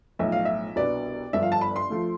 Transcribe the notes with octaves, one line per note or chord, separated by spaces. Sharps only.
B1 A2 F3 E5
F5
E5
C2 B2 B3 D4 D5
G1 G2 F3 E5
F5
A5
B5
C6
F3 A3